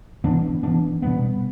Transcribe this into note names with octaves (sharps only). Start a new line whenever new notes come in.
E3 B3 D4
E3 B3 D4
B2 G3 B3